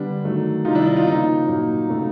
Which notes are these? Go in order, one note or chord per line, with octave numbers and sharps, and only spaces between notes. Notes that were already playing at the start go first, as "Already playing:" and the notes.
Already playing: D3 G3 B3 D4
D#3 F#3 A3
C3 D#3 G3 D#4 F4
D4 E4
D#4
D#4 F4
C#3 F3 A#3 D#4
A#2 F#3 A#3
C#3 F#3 A3